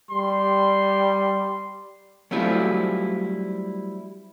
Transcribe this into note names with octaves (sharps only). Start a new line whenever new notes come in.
G3 C6
F#3 G3 A3 C4 E4 F4